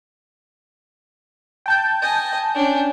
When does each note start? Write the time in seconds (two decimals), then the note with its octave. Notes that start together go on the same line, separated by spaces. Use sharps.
1.66 G5 A5 G6
2.02 D#5 G#5
2.55 C#4 D4